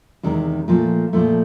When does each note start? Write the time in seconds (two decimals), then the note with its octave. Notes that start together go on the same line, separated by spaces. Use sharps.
0.23 E2 C3 D#3 G#3
0.68 A#2 F3 A3
1.13 A#2 F3 A3